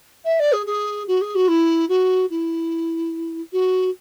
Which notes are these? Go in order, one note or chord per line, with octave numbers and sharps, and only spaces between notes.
E5
D5
G#4
G#4
F#4
G#4
F#4
E4
F#4
E4
F#4